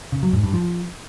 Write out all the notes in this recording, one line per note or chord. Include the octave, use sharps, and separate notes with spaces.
C#3
F#3
G#2
G2
F3